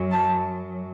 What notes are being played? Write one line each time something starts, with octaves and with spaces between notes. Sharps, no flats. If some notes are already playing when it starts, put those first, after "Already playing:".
Already playing: F#2 F#3
A5